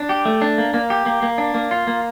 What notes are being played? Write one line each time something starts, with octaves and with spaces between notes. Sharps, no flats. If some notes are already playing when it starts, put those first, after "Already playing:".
Already playing: D4
G4
A3
D4
A#3
A#3
G4
A#3
A#3
D4
A#3
F4
A#3